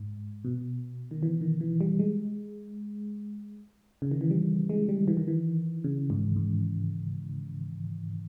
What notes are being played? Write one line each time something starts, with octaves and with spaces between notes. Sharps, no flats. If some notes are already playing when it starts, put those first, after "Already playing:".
Already playing: G#2
B2
D#3
E3
D#3
E3
G3
G#3
C#3
D#3
E3
G3
G#3
G3
E3
D#3
E3
C#3
G#2
G#2